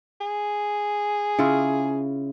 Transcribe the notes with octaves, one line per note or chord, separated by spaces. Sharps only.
G#4
C#3 E4 F4